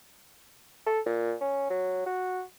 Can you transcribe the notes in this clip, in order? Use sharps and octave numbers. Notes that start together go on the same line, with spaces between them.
A4
A#2
C#4
F#3
F#4